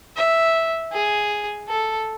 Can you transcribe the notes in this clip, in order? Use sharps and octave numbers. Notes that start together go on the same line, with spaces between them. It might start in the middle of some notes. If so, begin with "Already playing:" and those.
E5
G#4
A4